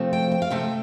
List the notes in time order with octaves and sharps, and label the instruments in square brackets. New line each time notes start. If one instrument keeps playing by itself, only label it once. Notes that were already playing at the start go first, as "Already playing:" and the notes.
Already playing: [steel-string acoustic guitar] C3 F3 A3 C4
G5
G5
F5
C3 A3 C4 G5